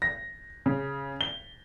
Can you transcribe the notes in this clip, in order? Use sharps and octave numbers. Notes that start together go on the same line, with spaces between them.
A#6
C#3
G7